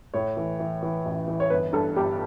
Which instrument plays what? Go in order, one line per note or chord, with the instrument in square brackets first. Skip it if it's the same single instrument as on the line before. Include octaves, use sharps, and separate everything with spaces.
[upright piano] A2 C#5
E3
E3
E3
A1
E3
C#5
G1 B4
G2 A4
G1 G4